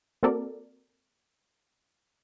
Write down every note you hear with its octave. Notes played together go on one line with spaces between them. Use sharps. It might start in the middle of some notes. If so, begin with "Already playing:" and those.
A#3 C4 F#4 A4 A#4 D5